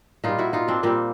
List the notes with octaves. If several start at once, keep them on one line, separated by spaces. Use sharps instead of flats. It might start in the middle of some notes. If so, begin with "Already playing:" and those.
A#2 G3 D#4 F4
E4 F#4
D#4 F4
C4 D4
A#2 G3 A#3 C4